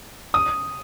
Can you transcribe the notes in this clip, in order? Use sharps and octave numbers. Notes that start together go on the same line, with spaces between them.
D#6